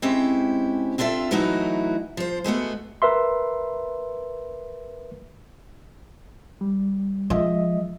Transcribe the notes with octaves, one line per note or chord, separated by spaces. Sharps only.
G#3 C4 C#4 E4 G4
C4 D4 F4 A4 E5
E3 F#3 A3 D#4 E4 F#4
F3 C5
G#3 A3 B3 F#4
A#4 B4 E5 C6
G3
F3 G#3 D#5 E5